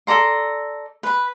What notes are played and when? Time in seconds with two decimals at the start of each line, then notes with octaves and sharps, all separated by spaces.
0.07 A4 D5 A#5 C6
1.03 B4 B5